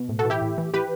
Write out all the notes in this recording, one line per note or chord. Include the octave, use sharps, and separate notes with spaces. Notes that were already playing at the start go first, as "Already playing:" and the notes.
Already playing: B2
A2
F#4 A4
E3
E4 G4
A2
E3
E3 G4 B4